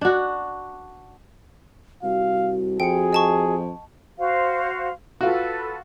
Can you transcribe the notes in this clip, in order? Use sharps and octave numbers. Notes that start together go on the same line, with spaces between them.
D4 F#4
C2 F#4 F5
F2 G#4 G5 C#7
D#5 A5 C#6
F#4 C5 F5
F4 F#4 A4 B4